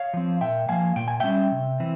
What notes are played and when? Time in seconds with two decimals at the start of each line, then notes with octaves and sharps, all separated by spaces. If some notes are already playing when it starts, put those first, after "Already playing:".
Already playing: C#5 F5
0.14 F3 C4
0.41 A#2 E5 G5
0.69 F3 A#3 F5 G#5
0.96 A#2 G5
1.08 G#5
1.20 G3 C#4 E5 G5
1.52 C3
1.80 E3 C4